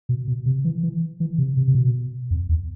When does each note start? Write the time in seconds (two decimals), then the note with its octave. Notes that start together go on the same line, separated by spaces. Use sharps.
0.09 B2
0.28 B2
0.46 C3
0.65 E3
0.83 E3
1.20 E3
1.38 C3
1.57 C3
1.68 C3
1.75 B2
2.31 F2
2.49 E2